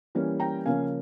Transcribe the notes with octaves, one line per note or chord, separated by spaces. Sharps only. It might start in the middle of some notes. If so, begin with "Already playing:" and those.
E3 G3 A#3 C#4
G5 A#5
C#3 F3 A#3 C#4 F5 G#5